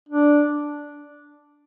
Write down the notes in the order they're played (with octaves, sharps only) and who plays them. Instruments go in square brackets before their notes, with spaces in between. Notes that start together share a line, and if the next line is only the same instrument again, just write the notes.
[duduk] D4